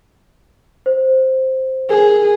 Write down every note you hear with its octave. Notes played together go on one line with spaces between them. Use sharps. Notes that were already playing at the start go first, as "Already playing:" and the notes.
C5
G#4 A#4